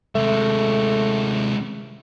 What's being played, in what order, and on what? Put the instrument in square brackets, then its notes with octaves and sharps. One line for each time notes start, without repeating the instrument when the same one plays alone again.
[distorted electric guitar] C3 G#3 [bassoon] A3